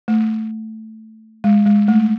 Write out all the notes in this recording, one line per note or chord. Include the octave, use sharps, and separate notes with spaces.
A3
G#3
G#3
A3